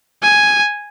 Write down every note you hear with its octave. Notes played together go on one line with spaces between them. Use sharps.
G#5